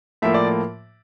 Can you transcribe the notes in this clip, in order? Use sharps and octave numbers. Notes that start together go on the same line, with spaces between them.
A2 F3 A#3 E5
D5